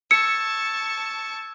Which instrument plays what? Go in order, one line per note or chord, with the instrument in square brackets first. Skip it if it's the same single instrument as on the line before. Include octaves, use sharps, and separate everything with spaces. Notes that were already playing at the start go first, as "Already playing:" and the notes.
[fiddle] A5 C#6 [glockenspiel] E6 G#6 E7 [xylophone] C#7